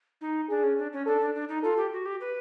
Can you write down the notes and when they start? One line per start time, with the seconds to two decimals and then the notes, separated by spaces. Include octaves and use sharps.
0.21 D#4
0.50 D4 G#4
0.63 C#4
0.78 D4
0.93 C#4
1.06 D4 A4
1.21 D4
1.35 D4
1.49 D#4
1.63 F4 A4
1.77 G4
1.92 F#4
2.06 G4
2.21 B4